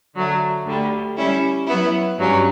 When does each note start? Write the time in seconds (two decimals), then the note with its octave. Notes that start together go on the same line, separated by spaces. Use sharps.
0.14 D3 F#3 A3
0.65 D2 D3 G3
1.16 G3 C#4 E4
1.66 F#3 B3 E4
2.18 G2 F#3 C#4